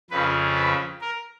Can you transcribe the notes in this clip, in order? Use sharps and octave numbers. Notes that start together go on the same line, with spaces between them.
F2 C#3 F3 B4
B4
A#4